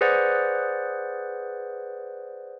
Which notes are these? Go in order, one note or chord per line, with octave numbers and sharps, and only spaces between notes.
G#4 B4 C5 D5 F#5